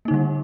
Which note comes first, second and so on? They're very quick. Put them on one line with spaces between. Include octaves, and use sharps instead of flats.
A#3 D#4 D3 G3